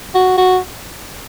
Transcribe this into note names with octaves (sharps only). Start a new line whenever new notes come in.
F#4
F#4